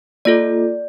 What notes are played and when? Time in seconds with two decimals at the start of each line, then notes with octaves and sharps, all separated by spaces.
0.25 A#3 F4 A4 D5